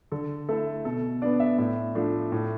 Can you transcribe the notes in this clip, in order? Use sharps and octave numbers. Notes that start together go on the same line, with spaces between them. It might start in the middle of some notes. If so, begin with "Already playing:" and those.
D3 A4
A3 E4 A4
B2 A4
B3 D4 D5
E5
A2
F3 A3 D4
A2